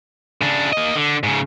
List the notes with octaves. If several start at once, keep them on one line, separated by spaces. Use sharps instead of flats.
C#3 D4
A#3 D#5
D3
G#2 C#3